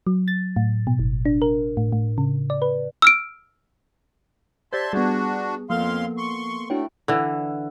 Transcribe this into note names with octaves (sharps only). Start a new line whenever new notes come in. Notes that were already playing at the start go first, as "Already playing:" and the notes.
F#3
A6
A2
B2
G1
D4
A#4
A2
A2
C#3
D5
B4
E6 F6 D7
G4 C5 D5 E5 A5 C6 G6 G#6
G3 B3 D4 F#4 G#4
F2 F3 A#3 B3 A4 F5 C6
C6 C#6
A3 D4 E4 F#4 C#5 G5
D3 E3